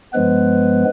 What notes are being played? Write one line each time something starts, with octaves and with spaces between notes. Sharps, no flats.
G2 F3 G#3 B3 B4